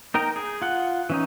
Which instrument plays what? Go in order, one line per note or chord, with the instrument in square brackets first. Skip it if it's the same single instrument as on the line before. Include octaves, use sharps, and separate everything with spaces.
[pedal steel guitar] D#4 A#4 G5 A#5
G#4
F4 F#5
E3 C#4 D#4